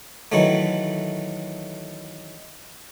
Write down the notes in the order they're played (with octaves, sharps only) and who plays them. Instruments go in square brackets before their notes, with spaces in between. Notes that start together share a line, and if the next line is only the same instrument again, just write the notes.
[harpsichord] D#3 E3 F#3 A3